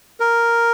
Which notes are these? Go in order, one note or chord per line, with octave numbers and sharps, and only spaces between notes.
A#4